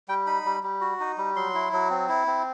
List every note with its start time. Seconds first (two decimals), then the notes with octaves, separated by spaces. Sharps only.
0.08 G3 G5
0.26 D#4 B5
0.45 G3
0.63 G3
0.81 F#4
1.00 D#4
1.18 G3
1.36 F#3 C6
1.54 E4
1.73 F#3
1.90 C4
2.09 E4
2.27 C4